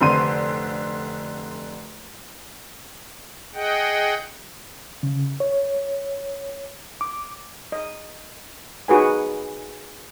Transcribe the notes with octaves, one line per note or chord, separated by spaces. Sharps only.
F1 D3 C4 C6 D#7
G#4 D#5 F#5 G5
C#3
C#5
D6
D#5
D#4 F#4 G#4 B4 G#5